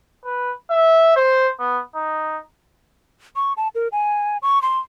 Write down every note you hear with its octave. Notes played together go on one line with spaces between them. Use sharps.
B4
E5
C5
B3
D#4
C#6
A5
A#4
G#5
C#6
C6